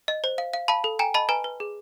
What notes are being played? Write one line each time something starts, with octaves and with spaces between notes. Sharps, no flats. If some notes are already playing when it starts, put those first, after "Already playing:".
D#5
C5
F5
F5
F5 A5 B5
A4
G5 G#5 A#5
D#5 A5 B5
B4 G#5 A#5
B4
G#4